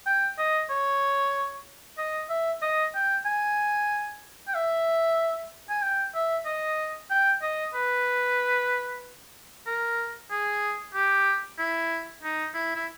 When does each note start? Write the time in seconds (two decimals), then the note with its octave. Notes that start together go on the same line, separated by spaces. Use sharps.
0.06 G5
0.38 D#5
0.70 C#5
1.98 D#5
2.30 E5
2.62 D#5
2.95 G5
3.25 G#5
4.48 G5
4.54 E5
5.69 G#5
5.82 G5
6.15 E5
6.46 D#5
7.10 G5
7.42 D#5
7.74 B4
9.66 A#4
10.31 G#4
10.95 G4
11.58 E4
12.23 D#4
12.54 E4
12.76 E4